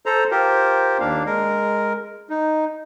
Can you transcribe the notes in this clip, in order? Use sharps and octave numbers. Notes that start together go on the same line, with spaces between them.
A4 C5 A#5
F4 G4 A#4 C5
D#2 A#3 D4 F5
G#3 A#4
D#4